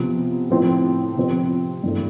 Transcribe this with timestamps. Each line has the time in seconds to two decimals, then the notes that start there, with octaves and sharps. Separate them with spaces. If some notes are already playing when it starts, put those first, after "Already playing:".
Already playing: C3 F3 B3
0.50 A2 F3 C4
1.16 C3 F3 C4
1.83 G2 E3 A3